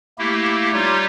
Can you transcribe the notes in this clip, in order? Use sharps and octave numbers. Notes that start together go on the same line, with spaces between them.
A3 A#3 E4 G4
G3 D#4 F4 G4 C#5